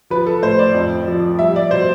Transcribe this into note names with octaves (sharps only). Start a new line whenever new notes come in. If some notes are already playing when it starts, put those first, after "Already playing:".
F3 B4
A4
A2 C5
D5
F2
F3
G3 E5
D5
B2 C5